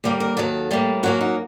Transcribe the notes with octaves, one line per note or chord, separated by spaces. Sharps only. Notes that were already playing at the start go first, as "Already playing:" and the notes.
D#2 D3 G3 A#3
A#4
D#2 D#3 F#3 A4
A2 G3 A#3
F#2 F#3 A#3 F#4
D#4